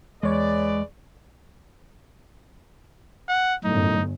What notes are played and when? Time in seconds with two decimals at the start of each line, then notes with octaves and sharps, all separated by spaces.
0.23 E2 G#3 G#4 B4 C#5 D5
3.29 F#5
3.64 G1 F#2 A2 D#4